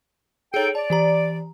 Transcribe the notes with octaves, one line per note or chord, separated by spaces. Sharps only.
D#4 G#4 A4 C#5 G5
D5 A5
E3 G4 A#5